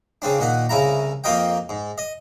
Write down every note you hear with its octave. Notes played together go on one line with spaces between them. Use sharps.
C#3 C4 D4
A#2 D#3 F#5
C2 C#3 E4 A#5
F2 A#3 F4 A#4 D#5 G5
G#2
D#5